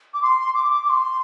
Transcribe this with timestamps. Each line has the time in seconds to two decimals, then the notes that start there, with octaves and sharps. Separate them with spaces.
0.14 D6
0.23 C6
0.54 D6
0.86 D6
0.89 C6